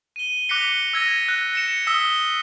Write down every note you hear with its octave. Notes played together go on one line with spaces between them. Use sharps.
D#7 G7
D6 F#6 A#6 B6 C#7 G7
E6 G#6 A#6 D#7
F#6
A#6 C#7 E7
D#6 E6 B6 G7